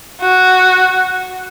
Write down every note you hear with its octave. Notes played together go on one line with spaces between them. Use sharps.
F#4